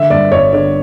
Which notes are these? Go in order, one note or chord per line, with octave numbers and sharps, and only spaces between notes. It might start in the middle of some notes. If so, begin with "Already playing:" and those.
Already playing: D3 E5
G2 D5
G1 C#5
D3 D5